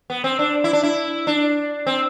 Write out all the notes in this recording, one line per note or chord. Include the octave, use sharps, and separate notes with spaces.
B3
C4
D4
E4
D4
E4
D4
C4